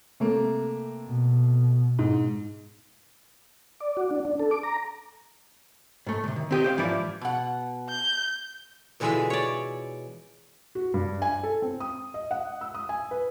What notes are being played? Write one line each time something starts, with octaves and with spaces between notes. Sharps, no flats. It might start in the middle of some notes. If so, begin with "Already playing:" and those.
C3 A3 A#3
B2
G#2
D5
F#4
D4
D4
A4
D6
A#5
G#2 A3
C2 C3
D#3
C4 G4 D#5
G4 C5 D5 F5
G#2 E3 F3 E4 D5
B2 F#5
G6
B2 D3 E3 G#3 F4 E5
C#5 D5
F#4
G2
G#5
A4
C4
D#6
D#5
F#5
E6
D#6
G#5
B4